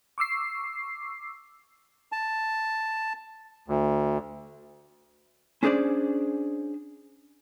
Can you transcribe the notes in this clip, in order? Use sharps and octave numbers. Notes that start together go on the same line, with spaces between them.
C#6 D6 E6 C7
A5
D2
C#4 D4 G#4 C5 D5